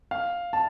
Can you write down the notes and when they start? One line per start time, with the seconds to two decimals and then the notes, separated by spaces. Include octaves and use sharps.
0.11 F5
0.53 A5